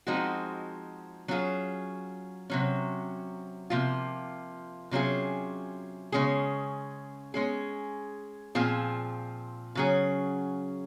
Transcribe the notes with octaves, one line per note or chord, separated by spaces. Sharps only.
F3 G#3 C4 D#4 F#4
F#3 C#4 F4 G#4
C3 F#3 C#4
C3 F3 A#3 F4
C3 F#3 C#4 F4 G#4
C#3 G#3 C#4 G#4
G#3 C#4 G#4
A#2 F3 C4 F4 G#4
C#3 F#3 C#4 G#4